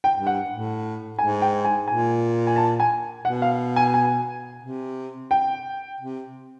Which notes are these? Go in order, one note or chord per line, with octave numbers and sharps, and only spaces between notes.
G5
G2
F#5
A2
G#2 G#5
G5
G#5
A#2 G#5
G#5
A5
G#5
B2 F#5
F5
G#5
G#5
C3
G5
C3